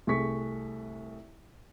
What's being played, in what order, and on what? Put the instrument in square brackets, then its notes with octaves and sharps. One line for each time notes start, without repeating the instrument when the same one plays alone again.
[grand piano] C2 A3 G#4 C#6 B6